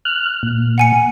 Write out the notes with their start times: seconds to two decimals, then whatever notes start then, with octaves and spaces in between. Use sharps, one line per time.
0.05 F6 F#6
0.43 A#2
0.78 F#5 G#5 C#7